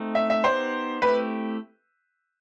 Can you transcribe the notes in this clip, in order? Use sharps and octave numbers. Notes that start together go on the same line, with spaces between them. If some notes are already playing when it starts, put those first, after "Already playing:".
Already playing: A3 C4 D#4
E5
E5
B3 D#4 G4 C5
A3 C4 E4 G4 B4